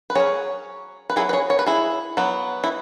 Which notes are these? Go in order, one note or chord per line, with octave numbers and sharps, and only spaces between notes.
B4
F#3 C#4 G#4 C#5
B4
F#3 B3 E4 G#4
B4
G#4 C#5
C#5
B4
E4 G#4
F#3 B3
E4